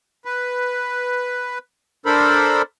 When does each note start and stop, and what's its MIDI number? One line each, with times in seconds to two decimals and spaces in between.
0.25 1.59 71
2.06 2.62 62
2.06 2.62 69
2.06 2.62 70
2.06 2.62 72
2.06 2.62 83